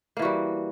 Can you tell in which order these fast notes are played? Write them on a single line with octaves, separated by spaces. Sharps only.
A#3 E3 F#4 G3